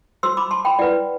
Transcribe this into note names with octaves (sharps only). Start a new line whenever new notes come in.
F#4 C5 C6 E6
B5 D6
A5 C6
G5 B5
E4 B4 D5 F#5